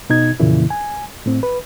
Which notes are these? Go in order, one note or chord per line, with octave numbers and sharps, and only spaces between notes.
B2 D#4 G#6
F2 A#2 C#3 E3 A#3 E4
G#5
A2 C4
B4